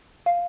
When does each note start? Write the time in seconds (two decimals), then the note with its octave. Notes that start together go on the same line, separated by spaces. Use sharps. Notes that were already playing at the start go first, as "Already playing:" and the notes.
0.26 F5